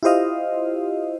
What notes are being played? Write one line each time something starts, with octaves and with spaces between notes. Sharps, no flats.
E4 F4 G4 C5 D#5 F5